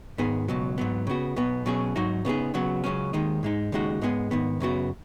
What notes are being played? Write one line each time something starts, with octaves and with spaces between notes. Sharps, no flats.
G#2 D#3 B3 G#4
C#2 B2 F#3
G#2 F#3 B3
C#3 B3 F#4
B1 B2 B3
B2 F#3 C#4 G#4
G#2 F#3 D#4 F#4
C#3 B3 D#4 G#4
C#2 C#3 F#3 B3 F#4
C#2 C#3 F#3 C#4
D#2 D#3 G#3 D#4
G#2 G#3 D#4
D#2 C#3 G#3 D#4 F#4
G#2 G#3 B3 G#4
G#2 D#3 B3
F#2 C#3 B3 F#4